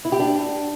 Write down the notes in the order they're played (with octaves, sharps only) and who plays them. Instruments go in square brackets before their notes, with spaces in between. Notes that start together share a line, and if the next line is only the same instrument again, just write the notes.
[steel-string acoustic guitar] E4
G4
D4